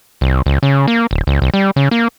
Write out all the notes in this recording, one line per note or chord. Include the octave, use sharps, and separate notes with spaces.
C2
C#2
C#3
A#3
D1
C#2
C2
G3
C#3
A#3